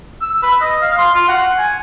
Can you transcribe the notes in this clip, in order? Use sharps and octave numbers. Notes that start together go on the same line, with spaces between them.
E6
B4
D#5
F5
C6
F4
F#5
G#5